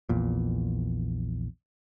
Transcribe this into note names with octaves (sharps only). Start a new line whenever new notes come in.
A#1 E2 A#2